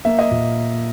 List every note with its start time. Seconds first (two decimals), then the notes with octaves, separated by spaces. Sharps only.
0.05 A#3 E5
0.19 D#5
0.31 A#2